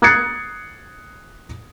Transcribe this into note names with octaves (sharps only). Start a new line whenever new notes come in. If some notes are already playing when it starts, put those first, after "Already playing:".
D#6 F#6 G#6 A6 C7 C#7